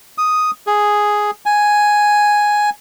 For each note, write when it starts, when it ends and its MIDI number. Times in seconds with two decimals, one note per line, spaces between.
0.18 0.51 87
0.67 1.31 68
1.46 2.70 80